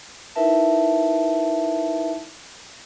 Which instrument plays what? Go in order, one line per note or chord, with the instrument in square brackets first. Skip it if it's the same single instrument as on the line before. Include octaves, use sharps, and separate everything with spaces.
[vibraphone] D#4 E4 A#4 B4 E5 A5